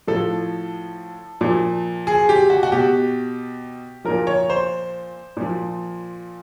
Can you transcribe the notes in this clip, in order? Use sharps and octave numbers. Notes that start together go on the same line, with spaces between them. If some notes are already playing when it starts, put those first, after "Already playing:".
A2 F3 A4
A#2 F3
G#4
G4
F#4
F#4
B2 G4
A#2 F3 A#4
C#5
C5
A#2 F3